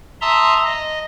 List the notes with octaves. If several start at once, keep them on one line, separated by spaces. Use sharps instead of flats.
E5 A5 A#5 C6 D#6 E6
D#5